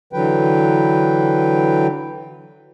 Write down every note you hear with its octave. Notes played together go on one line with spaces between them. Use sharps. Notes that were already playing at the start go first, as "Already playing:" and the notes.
D3 E3 F#3 B4 G5